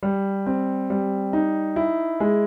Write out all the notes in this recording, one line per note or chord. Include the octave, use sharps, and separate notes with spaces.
G3
C4
G3
D#4
E4
G#3